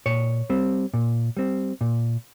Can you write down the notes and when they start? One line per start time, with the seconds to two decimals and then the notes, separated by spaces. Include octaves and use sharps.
0.06 A#2 C#5
0.50 G3 C4
0.94 A#2
1.37 G3 C4
1.81 A#2